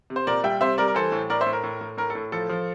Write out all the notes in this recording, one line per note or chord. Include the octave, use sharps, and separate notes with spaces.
C3
C5
A#2 A#4 D5
G3 E5 G5
C3 C5 E5
G3 A#4 D5
A#4
E3 A4 C5
A2
A2 A#4 D5
C5 E5
A2
A#4
A2
A2
A2 A#4
A4
A2
F3 A4
F3